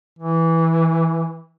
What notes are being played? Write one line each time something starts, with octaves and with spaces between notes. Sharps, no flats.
E3